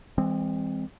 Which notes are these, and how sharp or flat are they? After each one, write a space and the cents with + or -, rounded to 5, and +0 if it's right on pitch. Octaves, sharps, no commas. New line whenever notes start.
E3 +0 G#3 -40 C4 +0